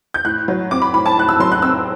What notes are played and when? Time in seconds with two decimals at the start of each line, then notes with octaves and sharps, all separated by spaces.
0.14 G6
0.25 A2 F#6
0.48 F#3
0.71 C4 D6
0.82 B5
0.93 A2 B5
1.06 A5
1.17 A2 F#6
1.29 E6
1.40 F#3 C6
1.52 F#6
1.62 C4 E6